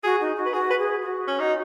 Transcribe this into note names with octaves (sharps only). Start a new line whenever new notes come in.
F#4 G#4
D#4
F#4
B4
F#4 G#4
B4
G#4
F#4
C#4
D#4